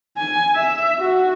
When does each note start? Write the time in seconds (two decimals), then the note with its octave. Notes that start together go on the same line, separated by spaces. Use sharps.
0.17 G#5
0.55 E5
1.00 F#4